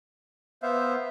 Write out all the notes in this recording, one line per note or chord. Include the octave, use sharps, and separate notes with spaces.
B3 C5 E5 F5